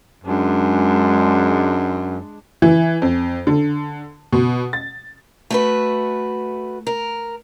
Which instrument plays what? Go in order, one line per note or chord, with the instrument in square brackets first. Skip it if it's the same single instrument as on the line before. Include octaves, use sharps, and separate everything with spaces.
[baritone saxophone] F#2 [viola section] G#3 D4
[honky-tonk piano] E3
F2
D3
B2
A6
[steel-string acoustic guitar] A3 F#4 B4
A#4